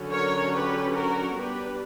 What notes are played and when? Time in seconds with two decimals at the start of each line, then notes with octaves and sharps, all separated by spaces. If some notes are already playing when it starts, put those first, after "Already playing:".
Already playing: D3 F#3 C#4
0.12 A#4 C#5
0.53 G4 B4
0.95 F#4 A#4
1.37 G3 B3 D4 G4 B4